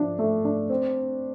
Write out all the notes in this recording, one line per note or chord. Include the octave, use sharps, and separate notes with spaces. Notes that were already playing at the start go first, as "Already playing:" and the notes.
Already playing: F3 D4
A3
D4
C4